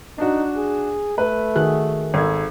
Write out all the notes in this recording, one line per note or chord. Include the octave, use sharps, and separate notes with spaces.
D4 D#4 F#4
G#4
A3 B4
D#3 F#4 G#4 F#6
G#1 A4 G#6